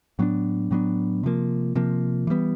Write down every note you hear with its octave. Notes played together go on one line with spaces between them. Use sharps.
A2 F#3 B3 D4
A2 F#3 B3 D4
C3 F3 A#3
C3 F3 A#3
E3 G3 B3